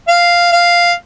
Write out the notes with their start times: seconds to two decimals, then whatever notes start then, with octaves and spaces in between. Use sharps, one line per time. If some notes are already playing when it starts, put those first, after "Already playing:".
0.08 F5
0.53 F5